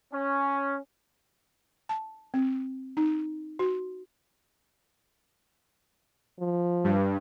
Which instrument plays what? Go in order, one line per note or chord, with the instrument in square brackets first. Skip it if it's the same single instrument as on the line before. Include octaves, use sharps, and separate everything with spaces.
[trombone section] C#4
[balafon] A5
C4
D#4
F#4
[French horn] F3
[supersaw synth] G2